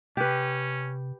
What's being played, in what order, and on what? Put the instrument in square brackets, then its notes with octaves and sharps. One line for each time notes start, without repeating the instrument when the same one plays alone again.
[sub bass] C3 [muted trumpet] C#4 [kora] G4 B4